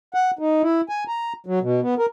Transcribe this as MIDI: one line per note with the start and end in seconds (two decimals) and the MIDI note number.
0.14 0.31 78
0.39 0.62 63
0.63 0.81 64
0.89 1.04 80
1.08 1.33 82
1.46 1.59 54
1.61 1.80 47
1.82 1.95 59
1.98 2.06 70